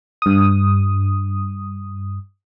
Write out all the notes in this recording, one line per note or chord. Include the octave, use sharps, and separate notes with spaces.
G2 D#6